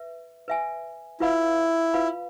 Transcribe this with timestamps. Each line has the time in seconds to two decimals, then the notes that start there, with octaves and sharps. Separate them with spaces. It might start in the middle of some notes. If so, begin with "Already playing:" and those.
Already playing: B4 E5
0.48 B4 E5 G#5
1.20 E4 F4 B4 F5 B5
1.94 F4 B4 F5 B5